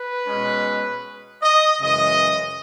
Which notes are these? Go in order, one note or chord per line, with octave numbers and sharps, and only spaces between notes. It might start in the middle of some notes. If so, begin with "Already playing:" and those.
Already playing: B4
B2 G#3 C#4
D#5
F#2 C#3 E3 G#3 D#5